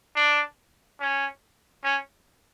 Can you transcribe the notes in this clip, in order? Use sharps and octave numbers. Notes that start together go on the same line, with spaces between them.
D4
C#4
C#4